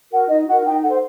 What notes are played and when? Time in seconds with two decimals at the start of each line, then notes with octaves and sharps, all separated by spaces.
0.11 F#4 A#4 F#5
0.28 D#4 D#5
0.47 F#4 A#4 F#5
0.65 D#4 G5
0.83 A4 C5 F#5